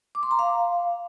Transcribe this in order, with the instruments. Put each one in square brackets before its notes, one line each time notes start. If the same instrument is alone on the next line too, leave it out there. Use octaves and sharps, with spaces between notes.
[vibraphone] D6
C6
A#5
F5